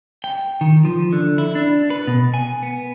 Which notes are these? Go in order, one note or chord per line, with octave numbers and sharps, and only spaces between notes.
G5
D#3
F3
D3
E4
D4
B4
B2
G#5
B3